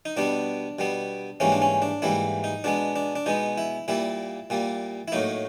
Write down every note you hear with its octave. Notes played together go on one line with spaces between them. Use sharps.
D#4
B2 G3 B3 D4
B2 G3 B3
G#2 E3 G3 A#3 C#4
D4
C#4
D4
G#2 E3 G3 A#3 E4
D#4
B2 G#3 B3 D4
D4
D4
B2 G#3 B3 D#4
E4
A#2 G3 A#3 E4
A#2 G3 A#3
E4
A2 F#3 A#3 D#4